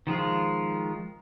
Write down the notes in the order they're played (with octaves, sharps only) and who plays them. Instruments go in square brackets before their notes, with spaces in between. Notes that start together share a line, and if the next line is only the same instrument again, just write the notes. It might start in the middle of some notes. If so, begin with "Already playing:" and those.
[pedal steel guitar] D#3 F3 G#3 F4